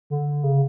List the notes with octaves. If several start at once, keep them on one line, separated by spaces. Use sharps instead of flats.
D3
C#3